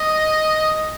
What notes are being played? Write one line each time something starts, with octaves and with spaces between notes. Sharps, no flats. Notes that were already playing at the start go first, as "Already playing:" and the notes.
Already playing: D#5